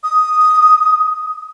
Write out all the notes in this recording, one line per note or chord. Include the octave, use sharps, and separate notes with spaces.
D#6